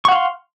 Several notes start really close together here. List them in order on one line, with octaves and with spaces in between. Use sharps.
C#6 F#5 F5 C6